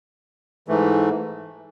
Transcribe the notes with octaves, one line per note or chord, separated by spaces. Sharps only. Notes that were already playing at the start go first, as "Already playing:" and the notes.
G#2 E3 A3